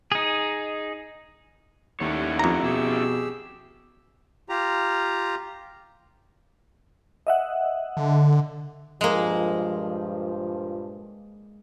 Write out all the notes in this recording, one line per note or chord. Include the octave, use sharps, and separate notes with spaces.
D#4 G#4
D#2 G3 A3 C#4 E4 C#5 F#5
F2 A#5
B2 G4 G#4 E6
F4 G4 A#5
D#5 E5 F#5
D3
G2 A#2 F3 G#3 A#3